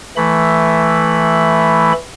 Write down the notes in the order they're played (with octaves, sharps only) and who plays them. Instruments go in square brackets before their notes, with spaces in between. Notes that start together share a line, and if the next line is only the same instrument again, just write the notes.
[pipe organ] E3 A3 B5